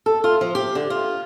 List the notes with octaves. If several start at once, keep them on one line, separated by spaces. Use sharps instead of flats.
A4
F4
F3
G4
D3
F4